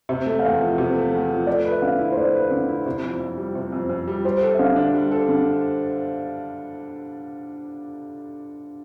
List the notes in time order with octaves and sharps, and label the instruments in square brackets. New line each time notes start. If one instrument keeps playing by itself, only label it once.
[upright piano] C3 [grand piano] E5
[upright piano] A3
[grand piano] F5
[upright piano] E2 [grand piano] E5
[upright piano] F3
C3
A3
E2
F3
[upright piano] A3 [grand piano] D5
[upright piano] B4
[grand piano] E5
[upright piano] D3 [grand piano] F5
[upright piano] E4
[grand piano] C5
[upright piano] A3 [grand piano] D5
[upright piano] B4
D3
E4
C3
F2
F2
G3
C3
F2
F2
G3
[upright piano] G3 [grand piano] C5
[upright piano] A4
[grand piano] E5
[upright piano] D3 [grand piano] F5
[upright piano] D4
G3
A4
D3